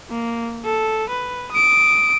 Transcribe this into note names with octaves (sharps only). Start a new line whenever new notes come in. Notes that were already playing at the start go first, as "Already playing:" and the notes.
A#3
A4
B4
D#6 D7